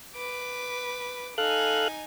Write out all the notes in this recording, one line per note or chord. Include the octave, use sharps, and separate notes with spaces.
B4 D6
D#4 A4 F5 G#5 F#6